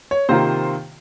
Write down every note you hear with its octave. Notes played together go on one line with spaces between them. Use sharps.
C#5
C3 D#3 A#3 F4 C5